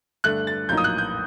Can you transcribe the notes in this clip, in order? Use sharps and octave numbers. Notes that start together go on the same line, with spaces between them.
G2 D3 A3 D4 F#6
A6
A#1 A2 F#3 A#3 D#4 G6
D#6
F#6
G6